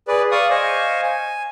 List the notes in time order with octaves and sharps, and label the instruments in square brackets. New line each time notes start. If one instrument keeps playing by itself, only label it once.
[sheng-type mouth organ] G#4 B4 D5
D5 F5 C#6 D#6
C5 D#5 F5 G#5 C#6
G#5